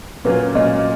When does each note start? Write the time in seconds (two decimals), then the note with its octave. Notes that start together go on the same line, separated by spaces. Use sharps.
0.25 A#2 F#3 A#3 C#4 F4 B4
0.55 A#2 F#3 A#3 C#4 F4 D#5